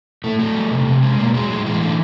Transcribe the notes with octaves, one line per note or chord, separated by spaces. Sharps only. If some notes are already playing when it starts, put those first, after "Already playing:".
A2 A3
F#3 A3
G3
C3
C3
G#3
B2 A#3
F#3 G#3
A2 G#3
E3 G#3
D3 A3